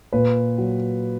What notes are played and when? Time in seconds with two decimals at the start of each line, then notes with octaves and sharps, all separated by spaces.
0.13 A#2 B4
0.58 F#3